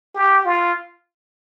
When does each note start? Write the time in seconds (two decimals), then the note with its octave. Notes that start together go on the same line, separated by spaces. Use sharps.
0.15 G4
0.45 F4